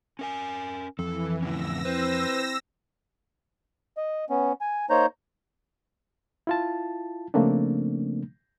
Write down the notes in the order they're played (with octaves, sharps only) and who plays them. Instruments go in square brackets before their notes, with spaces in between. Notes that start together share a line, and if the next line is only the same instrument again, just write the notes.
[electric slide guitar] C#4 A#4 G#5
[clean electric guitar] F2 [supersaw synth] E3 [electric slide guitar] A4
[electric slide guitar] A2 D3 C#4 [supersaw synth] E6 A#6
[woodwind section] C4 E4 C5 [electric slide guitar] B4
[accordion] D#5
B3 C#4
G#5
A#3 D#4 C5 C#5 A#5 G6
[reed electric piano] E4 F4 A5
C#3 F3 A3 A#3 C4 D4